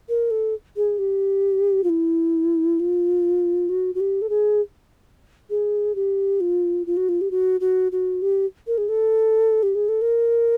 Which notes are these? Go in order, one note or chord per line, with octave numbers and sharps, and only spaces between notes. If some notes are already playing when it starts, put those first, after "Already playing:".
A#4
A4
G#4
G4
F4
E4
F4
F#4
F#4
G4
A4
G#4
G#4
G4
F4
F4
F#4
F4
G4
F#4
F#4
F#4
G4
A#4
G#4
A4
G4
G#4
A4
A#4